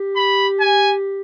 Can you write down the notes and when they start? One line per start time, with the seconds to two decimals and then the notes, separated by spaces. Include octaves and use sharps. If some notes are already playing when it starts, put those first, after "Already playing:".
Already playing: G4
0.17 B5
0.61 G#5